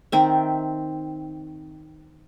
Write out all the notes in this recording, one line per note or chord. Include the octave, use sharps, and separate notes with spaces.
D#3 C4 E5